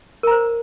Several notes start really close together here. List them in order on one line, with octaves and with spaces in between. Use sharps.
A#4 A#5 C5